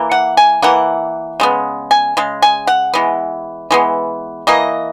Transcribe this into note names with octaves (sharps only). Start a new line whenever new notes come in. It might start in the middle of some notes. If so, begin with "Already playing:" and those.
Already playing: E3 A#3
F#5
G#5
E3 A#3 F#5
C#3 G#3 B3
G#5
C#3 G#3
G#5
F#5
E3 G#3 B3
E3 G#3 B3
E3 A#3 D#5